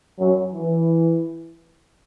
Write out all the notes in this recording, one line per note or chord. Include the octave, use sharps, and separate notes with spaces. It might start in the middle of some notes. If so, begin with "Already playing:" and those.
F#2 F#3
E3